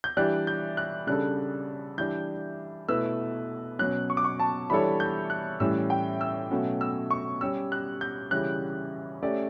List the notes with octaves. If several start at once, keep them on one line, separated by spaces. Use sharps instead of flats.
G6
E3 G3 D4 G4 D5 F#6
G6
F#6
C#3 G3 D4 A4 F#6
E3 G3 D4 G6
B2 A3 E4 B4 E6
B2 F#3 C#4 F#6
C#6
D6
C#6
A5
E3 G3 D4 A4 C#5 B5
G6
F#6
A2 E3 G3 C#4 E6
G5
E6
B2 F#3 A3 C#4 F#4
E6
C#6
G3 C#4 G4 C#5 E6
F#6
G6
C#3 E3 G3 C#4 F#6
A3 C#4 G4 D5